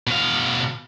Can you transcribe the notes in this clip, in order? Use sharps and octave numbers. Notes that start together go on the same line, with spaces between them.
B2 F5